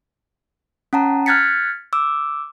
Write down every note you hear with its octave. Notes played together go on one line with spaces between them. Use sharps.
C#4 F#5 A5 A#5
F6 F#6 G#6 A6 B6 C#7
D6 E6